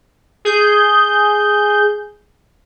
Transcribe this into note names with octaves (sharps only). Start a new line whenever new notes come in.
G#4 G6